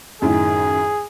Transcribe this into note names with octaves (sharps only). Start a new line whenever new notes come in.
F#2 A2 D#3 G#4